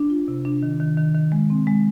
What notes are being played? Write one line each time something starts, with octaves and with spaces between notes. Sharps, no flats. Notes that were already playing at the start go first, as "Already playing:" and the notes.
Already playing: D4
F4
C3
D4
D#3
D#3
D#3
D#3
G#3
C4
G#3